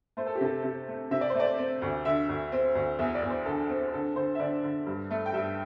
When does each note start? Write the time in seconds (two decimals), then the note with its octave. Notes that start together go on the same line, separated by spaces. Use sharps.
0.17 A3 C5
0.26 A4
0.35 G4
0.41 C3 A4
0.64 C3
0.88 A3
1.11 C3 E5
1.21 D5
1.30 C5
1.35 A3 D5
1.58 C4
1.82 D2
2.05 D3 E5
2.28 D2
2.52 C4
2.75 D2
2.99 E2 E5
3.15 D5
3.22 E2
3.30 C5
3.46 D3 A4
3.69 C4
3.88 C5
3.93 D3 A4
4.16 D3 C5
4.35 E5
4.40 D3 D5
4.63 D3
4.87 G2
5.11 A3
5.26 G5
5.33 G2 E5